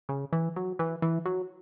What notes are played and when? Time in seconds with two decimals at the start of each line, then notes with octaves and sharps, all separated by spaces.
0.09 C#3
0.33 E3
0.56 F#3
0.79 E3
1.02 E3
1.25 F#3